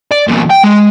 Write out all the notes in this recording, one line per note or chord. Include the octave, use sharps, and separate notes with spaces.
D5
E2 A#2
G5
G#3